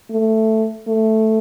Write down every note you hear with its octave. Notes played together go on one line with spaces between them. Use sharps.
A3
A3